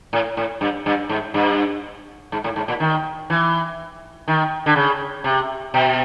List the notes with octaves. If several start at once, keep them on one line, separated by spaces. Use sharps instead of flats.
A2
A2
G2
G2
G#2
G2
G#2
A2
G#2
A#2
D#3
E3
D#3
D3
C#3
C3
B2